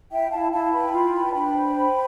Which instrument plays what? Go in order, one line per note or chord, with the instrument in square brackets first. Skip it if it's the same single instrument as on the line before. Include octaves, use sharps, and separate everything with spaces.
[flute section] E4 E5 G5
E4 F5 A5
E4 F5 A5
A5
B4 G5 B5
F4
B4
A5
D4 G5 B5
C5
C5